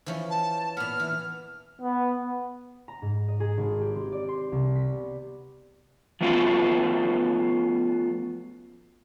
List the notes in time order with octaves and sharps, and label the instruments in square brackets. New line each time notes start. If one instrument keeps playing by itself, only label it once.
[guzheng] E3 F3 C#4
[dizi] A5
[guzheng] A#2 B3 [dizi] F6
[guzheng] E3
[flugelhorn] B3
[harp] A#5
G#2
D#5
G#4
G#1
G4
C4
D5
C6
C2
B6
B3
[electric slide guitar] F3 A3 B3 C#4 F4 F#4